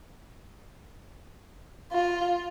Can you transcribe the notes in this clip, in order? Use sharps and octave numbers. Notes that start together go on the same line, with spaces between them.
F4